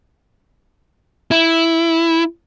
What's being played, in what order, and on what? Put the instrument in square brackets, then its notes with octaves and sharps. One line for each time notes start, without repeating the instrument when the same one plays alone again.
[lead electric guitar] E4